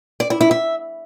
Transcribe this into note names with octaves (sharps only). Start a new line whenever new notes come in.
D5
E4
E4
E5